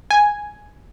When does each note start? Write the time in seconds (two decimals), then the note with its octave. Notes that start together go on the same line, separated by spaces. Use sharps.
0.11 G#5